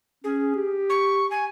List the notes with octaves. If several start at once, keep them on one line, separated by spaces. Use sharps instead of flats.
C#4 G#4
G4
C#6
G#5